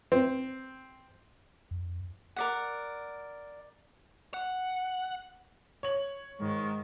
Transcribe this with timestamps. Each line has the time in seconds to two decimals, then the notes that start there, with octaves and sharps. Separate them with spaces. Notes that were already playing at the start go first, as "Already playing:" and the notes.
0.12 C4
1.71 F2
2.36 A#4 D5 F#5
4.34 F#5
5.83 C#5 F#7
6.40 G#2 D#3